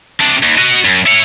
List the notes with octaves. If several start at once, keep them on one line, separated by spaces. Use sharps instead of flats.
C3 D4
D#2
F#4 D#5
F#2
E4 C#5